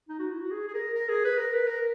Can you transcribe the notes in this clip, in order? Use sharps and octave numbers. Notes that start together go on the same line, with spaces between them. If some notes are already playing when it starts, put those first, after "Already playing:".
D#4
F#4
E4
F#4
G#4
G#4
A#4
A#4
G#4
B4
A#4
B4
A#4